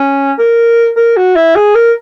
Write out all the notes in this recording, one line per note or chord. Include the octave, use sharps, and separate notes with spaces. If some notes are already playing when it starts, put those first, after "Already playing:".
Already playing: C#4
A#4
A#4
F#4
E4
G#4
A#4